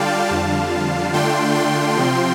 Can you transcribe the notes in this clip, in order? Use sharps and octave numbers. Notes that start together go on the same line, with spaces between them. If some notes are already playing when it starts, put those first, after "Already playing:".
Already playing: D3 G3 F4 D5 F5 G5 A5
F2 D3 G3 D4 F4 F5 A5
D3 A3 D4 F4 G5 C6
G5 C6
C3 F3 C4 F4